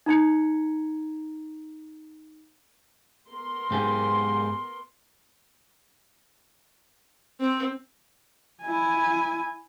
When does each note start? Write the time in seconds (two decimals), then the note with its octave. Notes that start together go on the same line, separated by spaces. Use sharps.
0.06 D#4 A#5 G#6 C#7
3.30 B3 A#4 C6
3.71 G#2 G4 G#4
7.40 C4
8.62 E4 G#5